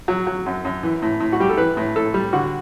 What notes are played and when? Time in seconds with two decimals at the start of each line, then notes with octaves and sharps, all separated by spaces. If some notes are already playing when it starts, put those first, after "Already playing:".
0.08 F#3
0.27 F#3
0.46 F#2
0.65 F#2
0.83 E3
1.02 A2
1.20 A2
1.33 F#4
1.40 G3 G4
1.49 A4
1.57 E3 B4
1.77 A2
1.96 A2 A4
2.14 G3
2.33 D3 F#4